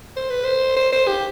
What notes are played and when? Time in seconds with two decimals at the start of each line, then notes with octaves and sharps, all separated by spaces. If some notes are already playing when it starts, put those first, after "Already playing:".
0.17 C5
0.30 B4
0.44 C5
0.77 C5
0.92 C5
1.08 G4